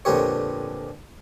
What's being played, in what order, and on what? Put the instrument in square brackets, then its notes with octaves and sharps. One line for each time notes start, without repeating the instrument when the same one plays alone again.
[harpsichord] F2 A#2 D3 B3 G4 C#5